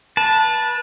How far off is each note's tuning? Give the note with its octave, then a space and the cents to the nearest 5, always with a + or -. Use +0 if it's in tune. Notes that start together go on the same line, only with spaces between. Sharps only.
B4 -30 A5 +0